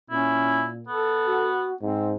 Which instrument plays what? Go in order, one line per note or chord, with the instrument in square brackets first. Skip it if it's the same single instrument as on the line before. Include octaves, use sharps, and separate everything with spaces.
[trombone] A#2 [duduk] C#4 [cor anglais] E4
[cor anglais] B3 [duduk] A4
[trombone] F#4
[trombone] G#2 [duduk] C4